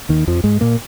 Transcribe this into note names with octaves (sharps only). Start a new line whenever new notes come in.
D#2 D#3
F2 F3
G#2 G#3
A#2 A#3